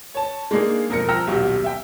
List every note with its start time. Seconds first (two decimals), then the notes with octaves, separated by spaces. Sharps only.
0.15 C#5 A5
0.51 G#3 A#3 D4 D#4 G#4
0.89 E1 F2 A#4 A#6 C#7
1.09 F3 G5 A#5 E6 F6 A#6
1.27 D#1 B1 F#4 G4
1.64 E5 G5